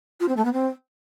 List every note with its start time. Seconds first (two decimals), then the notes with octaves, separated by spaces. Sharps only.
0.20 F4
0.28 C4
0.37 A3
0.45 B3
0.53 C4